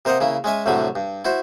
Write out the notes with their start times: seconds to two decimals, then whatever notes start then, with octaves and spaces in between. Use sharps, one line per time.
0.05 C3 A#4 C5 D#5 F5 F#5
0.21 C#3 A#3 E4
0.44 G#3 C#4 E5 G#5
0.66 C2 A2 D3 F#3 G3 B5
0.96 G2
1.25 E4 F#4 C5